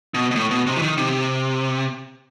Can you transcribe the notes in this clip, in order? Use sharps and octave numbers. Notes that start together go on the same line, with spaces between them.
B2
B2
A2
B2
C3
E3
D#3
C3